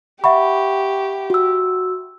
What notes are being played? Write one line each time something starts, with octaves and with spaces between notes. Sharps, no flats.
G4 E5 F#5 B5 C#6
F#4 E6